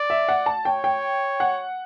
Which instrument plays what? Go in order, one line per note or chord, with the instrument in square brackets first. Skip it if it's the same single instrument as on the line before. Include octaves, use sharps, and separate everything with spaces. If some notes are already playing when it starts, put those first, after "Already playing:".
Already playing: [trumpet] D5
[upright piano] E5
F#5
A5
[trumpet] C#5 [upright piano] G5
[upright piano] G5
F#5